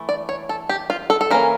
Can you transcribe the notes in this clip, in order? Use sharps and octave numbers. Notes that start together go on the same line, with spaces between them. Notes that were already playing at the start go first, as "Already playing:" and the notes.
Already playing: E3 A3
D5
C#5
A4
G4
F4
A4
A4
E3 A#3 C#4 A#4